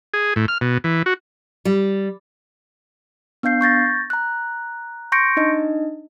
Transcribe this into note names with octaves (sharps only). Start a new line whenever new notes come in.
G#4
A2
F6
B2
E3
F#4
G3
B3 D4 F5 G6 C7
C#6 G6 A6 A#6
A#5 F#6
C6 C#6 G6 A#6 C#7 D7
D4 D#4 D#5